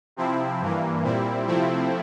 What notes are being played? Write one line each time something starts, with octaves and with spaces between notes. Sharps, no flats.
C3 F3 C4 E4
G2 E3 A#3
A#2 G3 C4 E4
C3 F3 A3 C4 E4